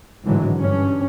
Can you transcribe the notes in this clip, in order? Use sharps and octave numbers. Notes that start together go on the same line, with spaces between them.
G#1 A2 D3 E3 F#3 G#3
G2 C#4